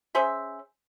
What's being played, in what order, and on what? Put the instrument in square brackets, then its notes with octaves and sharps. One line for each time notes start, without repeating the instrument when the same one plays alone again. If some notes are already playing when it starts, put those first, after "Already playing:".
[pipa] C#4 G#4 C5 E5